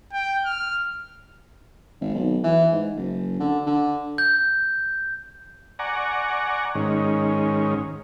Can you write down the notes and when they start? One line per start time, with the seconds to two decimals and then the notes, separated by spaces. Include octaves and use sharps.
0.13 G5
0.45 F6
2.01 G#1
2.15 B1
2.44 E3
2.72 G#2
2.96 F#1
3.40 D3
3.66 D3
4.18 G6
5.79 D5 F#5 G#5 A#5 C#6
6.75 G#2 D#3 C#4